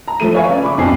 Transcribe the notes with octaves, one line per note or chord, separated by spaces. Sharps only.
A#5
F3 A3 A4 D#7
B4 C#5 E5 F5 G#5 C#6
C#3 D5
B5 C#6 D6
B1 F2 A#2 C#3 G#5 C7